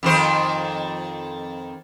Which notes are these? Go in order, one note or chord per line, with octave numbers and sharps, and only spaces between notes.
F2 D#3 C5